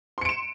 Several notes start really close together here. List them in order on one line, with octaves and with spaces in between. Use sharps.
C6 C#7 D7 E7